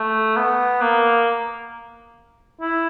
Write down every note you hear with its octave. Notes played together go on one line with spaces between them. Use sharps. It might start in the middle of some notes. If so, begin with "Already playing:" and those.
Already playing: A3
B3
A#3
E4